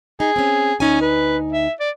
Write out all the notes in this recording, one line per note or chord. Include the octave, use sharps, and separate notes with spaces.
D#4 G#4
C4 C#4
D2 C#4 D#4 G#5
B4
E5
D5